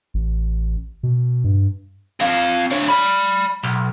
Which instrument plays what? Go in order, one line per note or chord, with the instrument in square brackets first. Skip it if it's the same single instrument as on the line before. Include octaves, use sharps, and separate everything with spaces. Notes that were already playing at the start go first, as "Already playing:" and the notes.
[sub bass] A1
B2
G2
[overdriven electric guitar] C4 F5
D3 C#5
D5 B5
B1